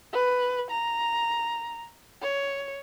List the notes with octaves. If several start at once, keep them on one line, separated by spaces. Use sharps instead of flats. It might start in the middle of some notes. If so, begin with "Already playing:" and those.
B4
A#5
C#5